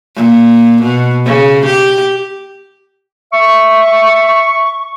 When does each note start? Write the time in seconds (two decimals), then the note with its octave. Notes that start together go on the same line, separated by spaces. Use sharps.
0.16 A#2
0.82 B2
1.26 C#3
1.65 G4
3.33 E5 C#6